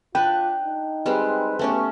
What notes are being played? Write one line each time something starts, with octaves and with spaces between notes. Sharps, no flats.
D4 F4 B4 G5
D#4
G3 G#3 C4 B4
A3 B3 C#4 G4